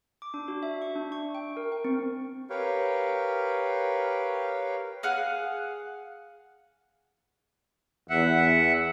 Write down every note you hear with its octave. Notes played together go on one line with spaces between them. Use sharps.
D6
D4
F#4
E5
C#6
D4
C#6
G5
A#4
G5
C4
G4 A#4 B4 C#5 F5 G5
G#4 F5 F#5
E2 E5 F#5